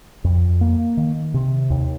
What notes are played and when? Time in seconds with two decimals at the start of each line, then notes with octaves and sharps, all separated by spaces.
0.24 F2
0.61 A#3
0.97 D#3
1.34 C3
1.70 D#2